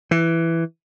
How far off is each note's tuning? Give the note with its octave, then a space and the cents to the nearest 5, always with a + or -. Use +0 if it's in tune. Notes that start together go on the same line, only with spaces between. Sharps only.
E3 +5